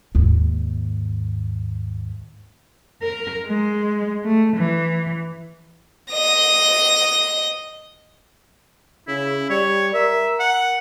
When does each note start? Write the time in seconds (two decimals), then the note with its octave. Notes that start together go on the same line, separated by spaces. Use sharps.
0.15 D#2 G#2
3.02 A#4
3.47 G#3
4.24 A3
4.56 E3
6.12 D#5 A#6
9.08 C#3 E4
9.50 G3 C#5
9.94 A#4 E5
10.40 F#5